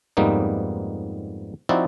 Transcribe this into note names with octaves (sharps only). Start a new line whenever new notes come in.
F2 G#2 G3 A#3 B3 D#4
F3 C4 D#4 E4 F#4 D5